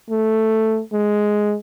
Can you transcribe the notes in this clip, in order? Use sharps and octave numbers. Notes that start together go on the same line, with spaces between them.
A3
G#3